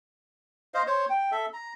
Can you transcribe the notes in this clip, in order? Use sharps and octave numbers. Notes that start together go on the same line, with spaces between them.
C5 D#5 F5
C5 C#5
G5
A4 E5
A#5